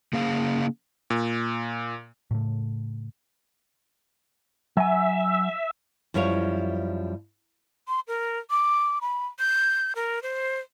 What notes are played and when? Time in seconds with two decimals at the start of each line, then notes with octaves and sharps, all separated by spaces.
0.13 C#3 A#3 G#4 F5
1.10 A#2
2.31 A2 C#3 A3
4.77 F#3 E5 G#5
6.14 F#2 F3 G3 E4 C#5 F5
7.88 C6
8.07 A#4
8.50 D6
9.01 B5
9.39 G6
9.95 A#4
10.23 C5